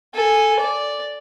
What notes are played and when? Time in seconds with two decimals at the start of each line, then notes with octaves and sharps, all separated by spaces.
0.14 A4 G#5
0.60 D5